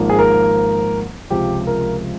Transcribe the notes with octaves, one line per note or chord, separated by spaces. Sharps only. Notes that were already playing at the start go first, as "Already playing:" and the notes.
Already playing: G#1 G#2 F3 A#3
G#4
A#4
C#2 C3 F3 C4 G4
A#4